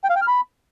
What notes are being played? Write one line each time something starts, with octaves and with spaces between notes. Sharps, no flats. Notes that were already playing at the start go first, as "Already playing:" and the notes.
G5
F5
G5
F6
B5